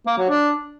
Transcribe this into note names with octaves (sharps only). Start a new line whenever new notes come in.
A#3
F#3
D4